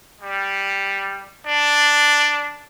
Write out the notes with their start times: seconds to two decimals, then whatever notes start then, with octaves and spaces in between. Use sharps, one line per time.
0.21 G3
1.45 D4